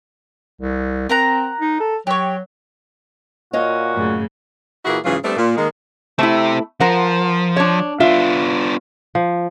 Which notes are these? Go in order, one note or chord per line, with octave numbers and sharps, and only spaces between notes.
C2
C4 A#4 F#5 A#5
D#4
A4
F#3 G4 C#5
A#2 F#4 C#5 D#5 F5
F#2 A2 C#3
A#2 E3 A#3 E4 F#4 G#4
G#2 C#3 E3 F#3 F4 G#4
G3 A3 B3 C4 D4
A#2
D#3 G#3 A#3
A3 C4 E4 G4
F3 A#4 C5 F#5
D4 C#5
B3 D4 F4 E5
F3